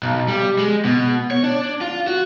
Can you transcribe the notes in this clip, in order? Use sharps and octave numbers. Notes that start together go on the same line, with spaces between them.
B1
G3
G#3
B2
C#5
D4
F4
F#4